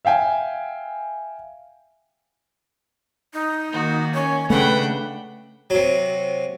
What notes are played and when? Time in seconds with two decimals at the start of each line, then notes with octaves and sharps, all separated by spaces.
0.05 E5 F5 G5 G#5
3.34 D#4
3.72 D#3 A#3 F#4
4.14 C#4 C#5
4.50 C#3 A3 D4 B4 F#5 G5
5.70 C3 F#3